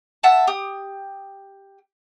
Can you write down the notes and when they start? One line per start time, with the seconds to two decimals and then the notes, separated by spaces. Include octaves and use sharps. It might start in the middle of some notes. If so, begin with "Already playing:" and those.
0.23 E5 F#5 A5
0.47 G4 D#6